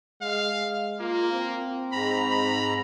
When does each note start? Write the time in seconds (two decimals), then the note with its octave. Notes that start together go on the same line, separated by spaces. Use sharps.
0.21 G#3 F5
0.59 G#3
1.00 A#3 F4
1.32 C4
1.92 G#2 A#5 B5
2.30 B5